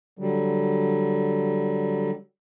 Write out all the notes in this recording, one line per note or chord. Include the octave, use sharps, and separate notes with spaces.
D3 F#3 G3